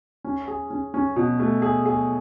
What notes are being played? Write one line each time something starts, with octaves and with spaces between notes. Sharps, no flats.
C#4
G#4
C#4
C#4
B2
A3
G#4
G#4